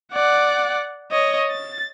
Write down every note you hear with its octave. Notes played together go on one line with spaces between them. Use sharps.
D5 F#5
C#5 D#5
A6